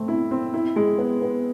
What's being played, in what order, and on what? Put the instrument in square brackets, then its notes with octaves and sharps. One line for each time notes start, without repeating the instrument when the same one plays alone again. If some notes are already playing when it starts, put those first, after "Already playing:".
Already playing: [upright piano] A3 C4
E4
C4
E4
G#3
B3
B3